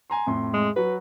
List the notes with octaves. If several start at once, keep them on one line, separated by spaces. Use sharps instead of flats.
G#5 A#5 C6
F2 A2 C6
G#3
F#3 F#4 B4